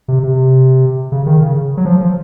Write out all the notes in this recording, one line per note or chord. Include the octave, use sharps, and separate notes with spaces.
C3
C3
C#3
D#3
C#3
F#3
F3
F3